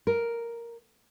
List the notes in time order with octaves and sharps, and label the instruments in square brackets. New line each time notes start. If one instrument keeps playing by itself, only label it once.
[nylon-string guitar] A#4